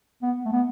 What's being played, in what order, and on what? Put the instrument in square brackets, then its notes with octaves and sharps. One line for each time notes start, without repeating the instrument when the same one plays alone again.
[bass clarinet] B3
A3
B3